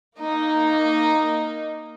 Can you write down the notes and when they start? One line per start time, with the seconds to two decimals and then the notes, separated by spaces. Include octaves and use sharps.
0.17 A#3 D#4